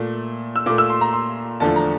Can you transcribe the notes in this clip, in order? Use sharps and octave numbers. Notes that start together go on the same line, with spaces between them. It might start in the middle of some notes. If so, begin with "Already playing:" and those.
Already playing: A#2 A3
E6
A#2 A3 D6
E6
C6
A#5
C6
E2 D3 F3 A3 A5
A#5